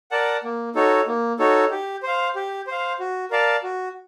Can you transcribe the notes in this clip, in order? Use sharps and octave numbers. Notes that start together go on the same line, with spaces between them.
A#4 D5 F#5 A5
A#3
D#4 F#4 A4 C#5
A#3
D#4 F#4 A4 C#5
G4
C5 F5
G4
C5 F5
F#4
A#4 D5 F5 A5
F#4